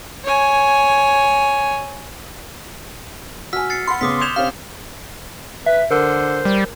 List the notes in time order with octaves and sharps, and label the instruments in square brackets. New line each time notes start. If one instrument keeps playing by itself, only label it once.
[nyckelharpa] C#5 G#5
[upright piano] F#4 G#5 [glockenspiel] E6 F6 B6
[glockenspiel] A6 C7 C#7
[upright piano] F#5 B5 [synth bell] C6
[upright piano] C#3 B3 [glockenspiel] D6 D#6 B6
[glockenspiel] G6 E7 G7 [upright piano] G#6 F7
[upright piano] C3 C4 C#4 [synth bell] F5
[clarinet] B4 [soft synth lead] E5
[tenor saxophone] D3 [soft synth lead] A#4 [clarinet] C5
[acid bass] G3